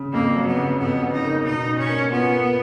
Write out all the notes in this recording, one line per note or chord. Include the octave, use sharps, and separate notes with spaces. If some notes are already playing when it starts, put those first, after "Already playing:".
Already playing: C#3
F2 A#3
F#3
B3
C#3
F2 B3
C#3
D#4
A#3
B2 D#4
B2
C#4
A#3
B3 F4
A#3